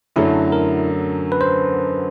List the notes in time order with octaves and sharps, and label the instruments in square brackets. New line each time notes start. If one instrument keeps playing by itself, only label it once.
[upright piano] F#2 D3 F#3 A3 [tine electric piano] E4
[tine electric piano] A#4
B4
C5